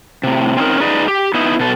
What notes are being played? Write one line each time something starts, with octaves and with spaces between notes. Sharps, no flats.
A2 C3
C4 C#4 D#4 A#4
D#4 G#4 B4 D5 D#5
G4
B3 D#4 E4
B2 A4